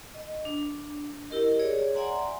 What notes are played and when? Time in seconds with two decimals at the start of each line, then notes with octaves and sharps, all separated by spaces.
0.14 D#5
0.45 D4
1.30 E4 G4 A#4 D#5
1.59 G#4 C#5 D5
1.95 D5 E5 F#5 G#5 A#5 C6